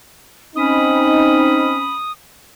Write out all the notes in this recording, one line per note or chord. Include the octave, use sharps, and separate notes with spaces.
C4 C#4 D#4 B5 D#6